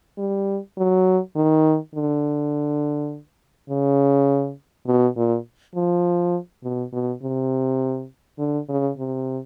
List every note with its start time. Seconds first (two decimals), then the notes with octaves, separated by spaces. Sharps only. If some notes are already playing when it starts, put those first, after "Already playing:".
0.18 G3
0.78 F#3
1.36 D#3
1.95 D3
3.70 C#3
4.87 B2
5.17 A#2
5.75 F3
6.63 B2
6.93 B2
7.23 C3
8.39 D3
8.69 C#3
8.98 C3